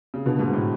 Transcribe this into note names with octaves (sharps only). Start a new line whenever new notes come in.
C#3
B2 D3
G#2 B2
A2